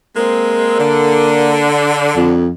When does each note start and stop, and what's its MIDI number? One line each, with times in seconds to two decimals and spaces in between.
0.16 0.76 56
0.16 1.71 58
0.16 0.76 60
0.79 2.43 50
2.16 2.51 41